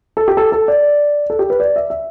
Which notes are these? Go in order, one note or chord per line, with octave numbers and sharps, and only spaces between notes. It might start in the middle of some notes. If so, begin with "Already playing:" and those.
A4
G4
A4
A4
D5
A4
G4
B4
D5
E5
E5